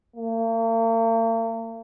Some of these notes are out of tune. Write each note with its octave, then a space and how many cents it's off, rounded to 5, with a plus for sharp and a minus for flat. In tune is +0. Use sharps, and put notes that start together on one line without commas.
A#3 -45